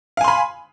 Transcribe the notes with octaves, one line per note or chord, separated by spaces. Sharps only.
F5 G#5 B5 C6